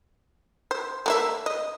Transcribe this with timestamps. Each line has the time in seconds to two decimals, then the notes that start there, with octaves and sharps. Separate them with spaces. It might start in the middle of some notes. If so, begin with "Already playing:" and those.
0.71 C5
1.06 A3 A#3 E5
1.46 D#5